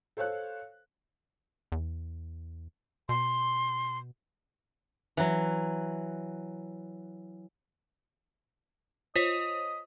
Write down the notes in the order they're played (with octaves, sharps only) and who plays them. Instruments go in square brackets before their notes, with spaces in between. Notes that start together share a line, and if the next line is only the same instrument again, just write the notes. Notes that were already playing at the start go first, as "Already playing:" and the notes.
[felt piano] A4 C5 C#5 F5 F#6
[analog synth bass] E2
[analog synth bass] B2 [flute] C6
[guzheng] E3 F#3
[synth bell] F4 C5 C#5 [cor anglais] D#5 [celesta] B6